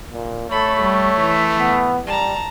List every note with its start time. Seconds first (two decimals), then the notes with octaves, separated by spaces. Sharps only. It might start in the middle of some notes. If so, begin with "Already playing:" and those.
0.13 A#2
0.50 A3 A4 C#5 B5
0.81 G3
1.20 E3
1.59 B3
2.06 G3 A5 A#5